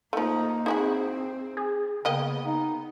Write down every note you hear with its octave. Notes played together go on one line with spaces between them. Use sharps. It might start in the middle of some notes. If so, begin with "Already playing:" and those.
F3 A3 A#3 D#4
C4 D#4 E4 F#4 G#4
G#4
C#3 A#3 B3 D#5 G5
D#4